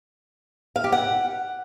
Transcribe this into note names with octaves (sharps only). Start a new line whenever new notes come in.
F5
G4
F#5